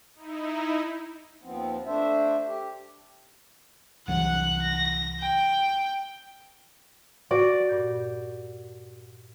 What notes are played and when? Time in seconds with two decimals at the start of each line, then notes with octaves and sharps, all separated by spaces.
0.15 D#4 E4
1.43 D#2 F3 B3 C4
1.86 A3 D4 C5 E5
2.47 G4
4.08 C2 E3 F#3 F#5 F#6
4.62 A#6
5.21 G5
7.31 F#4 D5
7.69 G2 A#2 G6